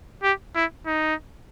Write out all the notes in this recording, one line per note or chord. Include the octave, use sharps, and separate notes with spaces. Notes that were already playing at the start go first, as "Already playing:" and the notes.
G4
E4
D#4